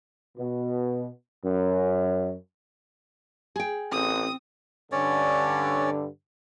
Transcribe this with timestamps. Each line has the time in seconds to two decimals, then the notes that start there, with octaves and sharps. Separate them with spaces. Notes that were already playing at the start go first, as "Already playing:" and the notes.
0.38 B2
1.44 F#2
3.56 G#4 G5
3.92 A1 C4 D#6
4.92 G2 D3 C#4 C#5 D5